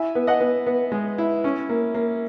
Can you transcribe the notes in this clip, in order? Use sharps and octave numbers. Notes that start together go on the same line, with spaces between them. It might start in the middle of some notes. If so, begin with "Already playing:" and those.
Already playing: E4 E5 G#5
B3
D#5 F#5
B3
B3
G#3
E4
C#4
A#3
A#3